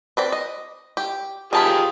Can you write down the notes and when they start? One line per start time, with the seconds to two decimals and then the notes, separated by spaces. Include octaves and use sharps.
0.17 C4 B4 D5
0.32 D#5
0.97 G4
1.53 D#3 F4 G4 G#4 A5 B5